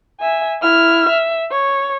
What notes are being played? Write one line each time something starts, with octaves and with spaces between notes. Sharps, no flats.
E5 G#5
E4 F6
E5
C#5